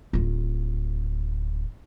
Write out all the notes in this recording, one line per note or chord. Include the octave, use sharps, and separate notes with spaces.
D1 F4